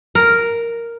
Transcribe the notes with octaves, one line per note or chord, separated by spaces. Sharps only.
A#4